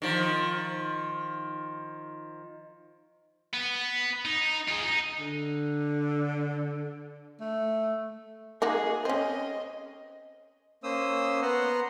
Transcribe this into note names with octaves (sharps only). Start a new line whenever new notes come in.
D#3 F3
B3
D#4
F4 G#4
D#4
D3
A3
A#3 D#4 F#4 G#4
C4 C#4 D#5
A#3 C#4 C5 D#6 E6
B3 F#5 A#5 C6